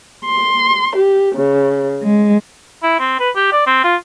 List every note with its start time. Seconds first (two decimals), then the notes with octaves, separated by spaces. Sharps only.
0.25 C6
0.97 G4
1.35 C#3
2.02 G#3
2.83 E4
3.00 C4
3.20 B4
3.36 G4
3.52 D5
3.67 C4
3.84 F4